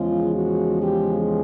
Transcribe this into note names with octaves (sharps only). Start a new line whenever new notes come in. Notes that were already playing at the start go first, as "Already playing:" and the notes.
Already playing: E2 C#3 F3 G#3 F4
F#4
G4